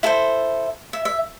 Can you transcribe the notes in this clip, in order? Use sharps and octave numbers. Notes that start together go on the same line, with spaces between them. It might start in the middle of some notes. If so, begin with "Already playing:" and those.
E4 A4 C5
E5
E5